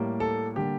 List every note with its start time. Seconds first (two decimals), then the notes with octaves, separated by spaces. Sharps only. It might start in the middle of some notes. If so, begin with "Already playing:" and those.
Already playing: A2 G3 A#3
0.20 A4
0.56 D3 G3 A#3 G4